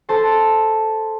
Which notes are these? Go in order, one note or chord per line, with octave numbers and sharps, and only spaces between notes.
A4 C5 A5 C6